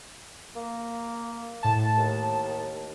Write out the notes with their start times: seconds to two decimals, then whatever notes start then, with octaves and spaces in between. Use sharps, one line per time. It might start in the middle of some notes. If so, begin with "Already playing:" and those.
0.56 A#3
1.63 A2 A5
1.98 D#2